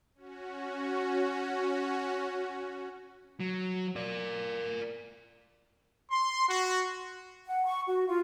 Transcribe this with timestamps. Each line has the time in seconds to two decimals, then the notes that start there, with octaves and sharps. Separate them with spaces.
0.15 C#4 F#4
3.40 F#3
3.96 A#4 D5
6.11 C6
6.49 F#4
7.46 F#5
7.66 C#6
7.87 F#4
8.07 F4